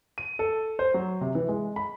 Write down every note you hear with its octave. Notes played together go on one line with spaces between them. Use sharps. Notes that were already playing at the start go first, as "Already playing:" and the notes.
D#7
A4
C5
F#3
C3
E3
G#3
B5